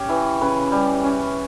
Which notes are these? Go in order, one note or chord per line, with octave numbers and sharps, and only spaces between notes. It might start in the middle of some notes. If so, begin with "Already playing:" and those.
Already playing: C#4 G4
E3
C#3 B4
G3
C#4